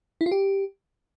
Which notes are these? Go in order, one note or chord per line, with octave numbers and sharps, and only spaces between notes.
E4
F4
G4